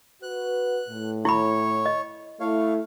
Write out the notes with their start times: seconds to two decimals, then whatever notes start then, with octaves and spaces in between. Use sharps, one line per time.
0.23 F#4 B4 F#6
0.89 A2
1.25 E4 C#5 B5
1.86 D#5
2.40 A3 E4 C#5 F5